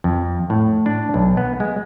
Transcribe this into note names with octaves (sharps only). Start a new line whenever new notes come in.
F2
A2
D4
B1
B3
G#3